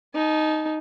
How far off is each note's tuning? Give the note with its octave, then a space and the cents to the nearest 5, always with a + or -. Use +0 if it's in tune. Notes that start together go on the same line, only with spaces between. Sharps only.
D#4 +0 A5 -35